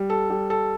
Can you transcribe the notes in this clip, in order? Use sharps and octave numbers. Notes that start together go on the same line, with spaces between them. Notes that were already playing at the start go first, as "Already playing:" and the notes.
Already playing: G3
A4
G3
A4